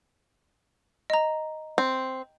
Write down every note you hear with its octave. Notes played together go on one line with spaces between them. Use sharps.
D#5 A#5
C4